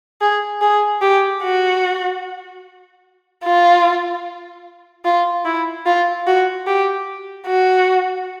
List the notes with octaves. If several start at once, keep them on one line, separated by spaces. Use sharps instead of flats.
G#4
G#4
G4
F#4
F4
F4
E4
F4
F#4
G4
F#4